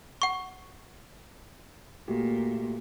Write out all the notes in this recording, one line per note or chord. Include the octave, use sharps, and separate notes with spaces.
F#5 C#6
A#2 A3 F#4 G4